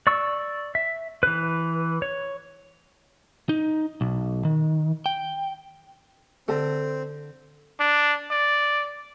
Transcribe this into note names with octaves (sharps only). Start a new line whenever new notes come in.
D5 C#6 E6
E5
E3 B4
C#5
D#4
B1
D#3
G5
D3 C4 A4 A5
D4
D5